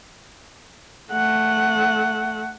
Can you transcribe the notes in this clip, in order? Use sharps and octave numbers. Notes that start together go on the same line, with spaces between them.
A3 F#5